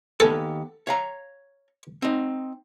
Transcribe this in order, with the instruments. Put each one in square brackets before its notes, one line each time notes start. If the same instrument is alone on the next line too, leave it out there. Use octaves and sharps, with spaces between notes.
[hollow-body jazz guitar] D#2 B3 G#5 [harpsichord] A4
[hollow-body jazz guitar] C#5 F5 A#5
C4 D#4